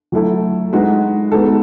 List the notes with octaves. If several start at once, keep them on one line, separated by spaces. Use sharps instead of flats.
F#3 A3 E4 A4
G#3 D#4 F#4 B4
G#3 B3 D#4 A4